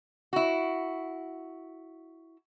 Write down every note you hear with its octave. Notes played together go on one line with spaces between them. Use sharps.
E4 F#4